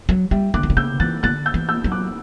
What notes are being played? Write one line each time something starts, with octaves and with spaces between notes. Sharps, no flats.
F#3
G3 E5 G5
D3 D6 F#6
E3
D3
C#3 E6 G6
E3 F#6 A6
D3 F#6 A6
E6 G6
E3
E6 G6
F#3
D6 F#6